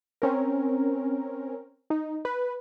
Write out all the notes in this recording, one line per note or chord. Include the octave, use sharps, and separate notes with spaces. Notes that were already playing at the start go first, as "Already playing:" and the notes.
C4 C#4 A#4
D#4
B4